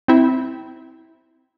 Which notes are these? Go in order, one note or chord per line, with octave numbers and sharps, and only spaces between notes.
C4 E4